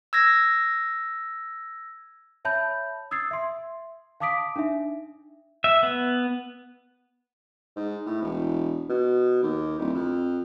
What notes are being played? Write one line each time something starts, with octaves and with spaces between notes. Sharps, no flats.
E6 G#6 A#6
C#5 E5 A5 B5 G6
D#6 E6 G#6 A6 C7
E5 C6
F5 A5 D6 D#6 B6 D7
D4 D#4 E5
E5
B3
G#2
A2
E1
B2
D#2
D1
F2